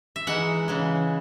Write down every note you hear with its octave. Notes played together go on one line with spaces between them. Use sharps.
E5
E3 G#3 D#4 F#5
C#3 E3 G#3